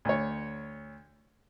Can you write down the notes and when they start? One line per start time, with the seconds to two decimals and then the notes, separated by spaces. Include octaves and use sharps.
0.05 D2 C#5